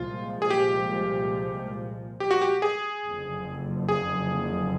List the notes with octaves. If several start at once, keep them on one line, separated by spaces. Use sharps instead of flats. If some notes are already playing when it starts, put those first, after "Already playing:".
Already playing: C2 A#2 F3 G#3 F4
G#4
G4
G4
F#4
G4
G#4
F#1 F2 D3
G#4